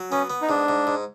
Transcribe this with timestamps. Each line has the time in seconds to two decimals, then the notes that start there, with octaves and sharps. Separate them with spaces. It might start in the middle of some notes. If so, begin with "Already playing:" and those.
Already playing: F#3
0.11 B3 C#4
0.30 B3
0.42 D#4
0.49 G#2 D4
0.68 G#2
0.87 G#2